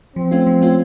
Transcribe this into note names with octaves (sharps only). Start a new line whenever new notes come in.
F3 C4
A3 C#4 F4
F3
A3 C#4 F4